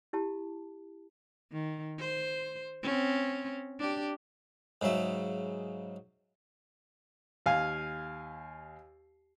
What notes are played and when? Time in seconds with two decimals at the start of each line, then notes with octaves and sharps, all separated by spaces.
0.13 E4 G4 A5
1.52 D#3
1.99 C5
2.83 C4 C#4
3.80 D4 G4
4.81 G#2 C#3 F#3 E5
7.46 D#2 F5 G#5 F6